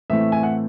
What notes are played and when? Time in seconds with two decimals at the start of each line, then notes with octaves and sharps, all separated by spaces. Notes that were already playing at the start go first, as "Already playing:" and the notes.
0.10 A2 E3 A3 C4 E5
0.32 G#5
0.43 F#5